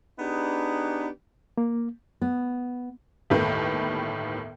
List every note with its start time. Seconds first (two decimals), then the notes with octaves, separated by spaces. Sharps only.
0.19 B3 D4 D#4 G4 G#4 B4
1.58 A#3
2.22 B3
3.30 G1 D#2 A2 D#3 B4 G6